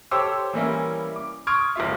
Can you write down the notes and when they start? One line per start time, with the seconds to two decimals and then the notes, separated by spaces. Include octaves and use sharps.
0.11 G4 A4 C5 C#5 D6 E6
0.53 E3 G3 A#3 C#4 E4
1.16 D6
1.47 C6 C#6 D#6 F6 G#6 D7
1.76 F#1 G#3 F4 E5